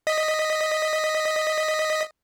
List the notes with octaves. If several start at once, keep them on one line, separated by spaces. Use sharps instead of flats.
D#5 B6